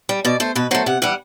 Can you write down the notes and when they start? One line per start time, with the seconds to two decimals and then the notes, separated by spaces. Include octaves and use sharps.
0.09 G3
0.25 B2 D5
0.40 A3 C5
0.55 B2 B4
0.71 F#3 A3 C5
0.86 C3 F#5
1.02 E3 G3 F#5